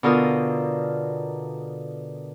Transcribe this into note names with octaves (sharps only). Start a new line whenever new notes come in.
B2 D3 F4 A#4 D#6